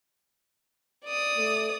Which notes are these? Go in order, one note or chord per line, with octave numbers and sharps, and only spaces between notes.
D5 D#6
A3